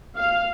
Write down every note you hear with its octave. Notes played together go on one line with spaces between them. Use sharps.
F5